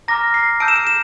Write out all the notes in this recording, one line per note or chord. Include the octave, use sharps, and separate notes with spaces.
A#5 D6 F6 A#6
C7
A5 E6 G6 D7
E7
D7
E7